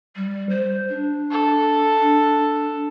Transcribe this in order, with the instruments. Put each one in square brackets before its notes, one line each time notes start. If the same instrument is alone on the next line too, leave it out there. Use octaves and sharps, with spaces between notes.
[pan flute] G3
C5
D4
[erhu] A4
[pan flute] D4